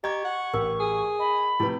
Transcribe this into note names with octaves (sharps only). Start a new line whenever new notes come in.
G4 D#5 A#5 C#6 G#6
F#5
A1 G4 A#4
G#4
D#5 B5
A2 C3 F3 E4 G4 B4